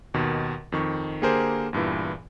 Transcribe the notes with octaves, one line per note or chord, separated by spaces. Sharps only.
D#2 B2 D#3
F2 D#3 C#6
D3 A#3 G4 G#4 A#4 C5
E2 G2 A#2 E3